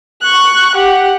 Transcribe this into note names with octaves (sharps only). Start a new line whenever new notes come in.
C#6 F#6
G4 F#5